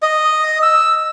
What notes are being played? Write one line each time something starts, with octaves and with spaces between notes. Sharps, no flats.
D#5
E6